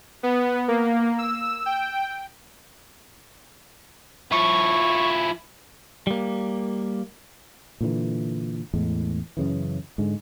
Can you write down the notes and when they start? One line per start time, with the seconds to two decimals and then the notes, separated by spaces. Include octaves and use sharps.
0.23 B3
0.68 A#3
1.18 E6
1.66 G5
4.32 F3 E4 C#6
6.07 G3 A#3
7.81 A#2 D3 E3
8.74 E2 A2 G#3
9.37 F#2 C#3 E3
9.98 G#2 D3 G#3